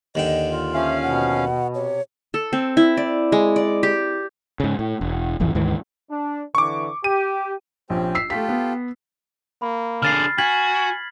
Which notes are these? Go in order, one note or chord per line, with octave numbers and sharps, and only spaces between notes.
D#2 D3 D#5 G5
F4
F3 C#4 E5 F5
B2 F#5
C3 C#5
A4
C4
E4
D5
G#3
D5
G4
G#2 C#3
A2
E1
D1 G#1 F2 E3
D2 G#2 D#3 E3
D4
D3 E3 C#6 D6
G4 D#7
A#1 C4 C#4 G4
E6 B6 C7
A3 F4 G4 A4 B6
B3
A#3 B5
D3 G#4 F6 A6 C7
F#4 G#5 G#6 B6 F#7